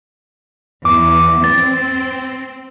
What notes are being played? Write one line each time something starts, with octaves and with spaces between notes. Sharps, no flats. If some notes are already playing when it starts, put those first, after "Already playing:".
E2 D6
C4 A6